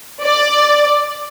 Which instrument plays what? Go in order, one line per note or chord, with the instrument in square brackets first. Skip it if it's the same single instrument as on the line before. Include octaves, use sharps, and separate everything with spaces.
[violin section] D5